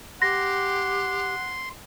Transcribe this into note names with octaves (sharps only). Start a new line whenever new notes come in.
G4 F#5 C6 A#6